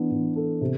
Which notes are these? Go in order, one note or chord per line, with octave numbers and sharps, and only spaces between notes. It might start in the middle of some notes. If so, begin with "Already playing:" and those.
Already playing: E3 B3 D4
E3
A4
C3